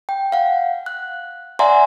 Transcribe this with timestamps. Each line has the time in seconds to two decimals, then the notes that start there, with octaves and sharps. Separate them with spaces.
0.09 G5
0.32 F5 F#5
0.86 F#6
1.59 D5 E5 F#5 G#5 A#5 C6